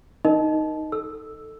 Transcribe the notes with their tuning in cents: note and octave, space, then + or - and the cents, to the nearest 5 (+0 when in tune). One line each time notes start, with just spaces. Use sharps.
D#4 +0 A#4 +0 D#5 +0
A4 +5 E6 +0